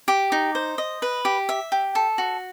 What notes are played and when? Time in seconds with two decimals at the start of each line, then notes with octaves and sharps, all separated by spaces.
0.08 G4
0.32 D#4
0.55 C5
0.78 D#5
1.02 B4
1.25 G4
1.49 E5
1.72 G4
1.95 A4
2.18 F#4